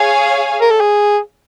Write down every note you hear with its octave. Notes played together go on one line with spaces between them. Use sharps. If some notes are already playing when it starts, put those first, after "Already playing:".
Already playing: G#4 C#5 F5 G#5
A#4
A4
G#4